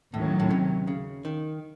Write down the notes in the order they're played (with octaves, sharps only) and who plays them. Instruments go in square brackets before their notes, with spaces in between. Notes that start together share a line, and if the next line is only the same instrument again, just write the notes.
[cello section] D#2 D#3 F#3 C#4 [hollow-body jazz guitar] A2
[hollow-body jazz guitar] A2
C3
C#3
D#3